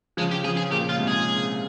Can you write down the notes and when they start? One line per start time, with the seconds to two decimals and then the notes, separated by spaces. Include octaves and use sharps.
0.17 C#3 F3 G#3
0.31 G4
0.44 C#3 F3 G#4
0.57 G#4
0.71 A#2 C#3 G4
0.89 F4
0.97 G#2 C3
1.07 G#4